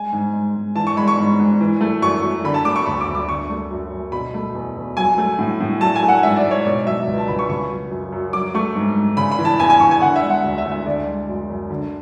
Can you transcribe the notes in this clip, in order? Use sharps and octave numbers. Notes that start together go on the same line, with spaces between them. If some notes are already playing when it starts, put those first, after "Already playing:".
Already playing: G#3 G#5
G#2
G#3
G#2
E3 A5
C#6
G#3 B5
C#6
G#2
G#2
E3
A3
F#2 C#6
F#2
D3 B5
A5
A3 D6
C#6
D2 B5
D6
D2
D6
D3 C#6
A3
F#2
F#2
B2 B5
A3
E2
E2
F#3 G#5
A3
A2
A2
F#3 A5
G#5
A3
F#5
G#2 E5
D5
G#2
C#5
B2 D5
F#3 E5
C#2
A5
C#2 B5
C#6
C#3 C#6
F#3
F#2
F#2
F#3 D6
A3 C#6
G#2
G#2
C#3 B5
B5
E3
A5
E2 G#5
G#5
E2 C#6
G#5
D3 F#5
E5
G#3
F#5
D2
E5
D2
E5
D3 D5
G#3
F#2
F#2
D3